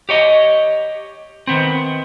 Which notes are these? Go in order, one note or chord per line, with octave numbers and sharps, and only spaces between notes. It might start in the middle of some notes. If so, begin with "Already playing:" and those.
G4 C#5 D#5
D#3 B3 C4